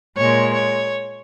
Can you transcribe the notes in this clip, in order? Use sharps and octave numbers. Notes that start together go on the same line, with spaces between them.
A#2 G#3 C#5
C#5